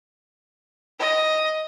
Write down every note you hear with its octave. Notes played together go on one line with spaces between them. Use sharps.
D#5